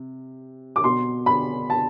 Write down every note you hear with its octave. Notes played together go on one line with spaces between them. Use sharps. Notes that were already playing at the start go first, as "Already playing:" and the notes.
Already playing: C3
D6
B2 C6
B5
A5